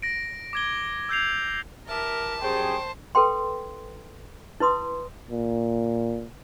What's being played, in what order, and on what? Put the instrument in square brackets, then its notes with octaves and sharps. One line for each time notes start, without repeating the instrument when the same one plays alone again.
[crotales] A#6 D7
D6 G#6 G7
E6 G6 C7 F7
[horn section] E3 G4 E5 [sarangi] A#4 [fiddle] A5
[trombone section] F#2 G4 G#4 [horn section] G3 C#5 G5 [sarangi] C5
[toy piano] A4 B4 G5 C6
E4 B4 C6 D#6
[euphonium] A#2